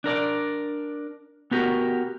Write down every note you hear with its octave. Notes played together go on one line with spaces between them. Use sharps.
D4 A#4 D5
B3 F#4 G4 A#4